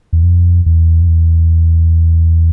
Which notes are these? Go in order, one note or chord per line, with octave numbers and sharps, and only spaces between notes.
E2
F2
E2
F2
E2